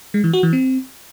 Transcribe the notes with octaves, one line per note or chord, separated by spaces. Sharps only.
G#3
E3
F#4
E3
C4